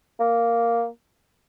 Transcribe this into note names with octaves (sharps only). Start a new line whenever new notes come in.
A#3